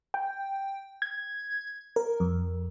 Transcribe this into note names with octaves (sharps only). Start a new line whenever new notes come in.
G5
G#6
A#4
F2